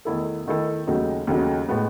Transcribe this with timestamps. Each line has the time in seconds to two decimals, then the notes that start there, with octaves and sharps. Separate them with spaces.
0.05 E2 D#3 A3 E4 A4
0.46 E2 D#3 A3 E4 A4
0.87 D#2 C#3 F#3 A3 D#4
1.27 D#2 C#3 F#3 A3 D#4
1.68 A2 G#3 B3